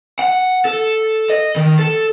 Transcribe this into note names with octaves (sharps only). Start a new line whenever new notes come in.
F#5
A4
D#5
D#3
A4